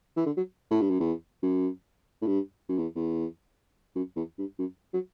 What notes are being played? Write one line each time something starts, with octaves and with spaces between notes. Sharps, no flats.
E3
D3
F#3
A2
G2
F#2
E2
F#2
A2
G2
F#2
E2
E2
F#2
E2
G2
F#2
F#3